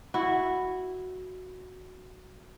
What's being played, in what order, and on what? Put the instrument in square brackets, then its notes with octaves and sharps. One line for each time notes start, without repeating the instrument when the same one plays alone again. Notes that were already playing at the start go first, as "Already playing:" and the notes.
[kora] E4 F#4